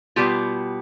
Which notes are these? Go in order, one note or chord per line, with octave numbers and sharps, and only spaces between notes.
B2 G3 B3 F4 G4